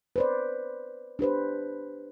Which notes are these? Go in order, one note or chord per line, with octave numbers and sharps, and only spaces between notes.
B4 C5 D5
D4 G4 B4 C5